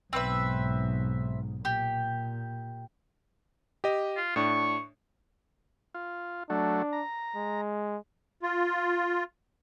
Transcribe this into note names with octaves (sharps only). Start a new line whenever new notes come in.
B1 G#2 C4 B4 E5
A#2 G4
G4 D#5
F4
A2 D4 C#6
F4
F#3 A3 D4
A#5
G#3
F4